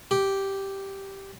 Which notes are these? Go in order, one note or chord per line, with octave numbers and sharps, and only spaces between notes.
G4